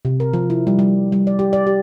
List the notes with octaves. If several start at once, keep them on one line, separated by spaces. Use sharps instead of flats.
C3
A#4
F3
E4
G3
G3
G3
D5
G4
D5
G4